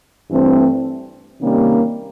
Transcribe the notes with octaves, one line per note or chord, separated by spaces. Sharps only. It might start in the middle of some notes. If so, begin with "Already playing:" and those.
G2 E3 A3 C4
C3 D#3 G3 A#3 C#4